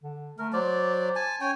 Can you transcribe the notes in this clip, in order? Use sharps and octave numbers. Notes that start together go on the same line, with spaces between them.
D3
A3 A#4
F#3 C5 D5
G#5 A5
C#4 C#5 G5 G#5